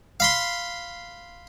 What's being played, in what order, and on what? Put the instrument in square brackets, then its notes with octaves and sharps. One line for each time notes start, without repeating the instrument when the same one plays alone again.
[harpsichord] F5 B5 C6